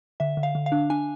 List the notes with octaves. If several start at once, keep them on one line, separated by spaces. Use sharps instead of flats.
D3 E5
D3
F5
D3
F5
D4
D4 G#5